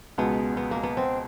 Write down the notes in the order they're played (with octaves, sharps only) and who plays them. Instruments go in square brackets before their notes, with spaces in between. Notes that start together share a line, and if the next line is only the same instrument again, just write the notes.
[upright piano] C#2 B2 G#3 [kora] B3
[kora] B3
A#3
B3
C4